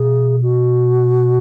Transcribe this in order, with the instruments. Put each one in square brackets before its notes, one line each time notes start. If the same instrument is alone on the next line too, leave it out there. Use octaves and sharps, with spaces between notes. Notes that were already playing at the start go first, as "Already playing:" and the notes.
Already playing: [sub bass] B2 [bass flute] G#4
[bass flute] F#4